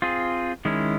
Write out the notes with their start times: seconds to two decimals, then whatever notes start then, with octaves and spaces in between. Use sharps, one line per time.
0.02 C4 F4 G#4
0.65 D#3 G#3 C#4 E4